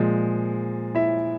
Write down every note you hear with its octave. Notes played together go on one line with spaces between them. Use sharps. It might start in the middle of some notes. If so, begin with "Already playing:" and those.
Already playing: A#2 F3 G#3
E4 E5